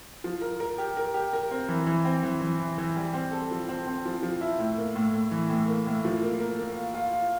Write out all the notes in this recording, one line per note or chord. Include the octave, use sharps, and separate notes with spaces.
F3
A#4
A#4
G4
A#4
G4
A#4
C4
E3
E3
C4
E3
E3
E3
E3
G3
C4
A4
F3
C4
C4
F3
F3
E4
A2
A#3
A2
A2
E3
A2
A#3
A2
F3
A#3
A#4
A#3
F4
F4
F4